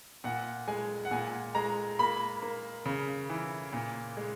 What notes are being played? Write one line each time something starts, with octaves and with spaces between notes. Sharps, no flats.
A#2 F#5
G#3 G#5
F#5
A#2 G#5
G#3 A#5
A#3 B5
A#3
C#3
E3
A#2
G#3